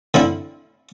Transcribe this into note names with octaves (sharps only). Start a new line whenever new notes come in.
D3 C4 E4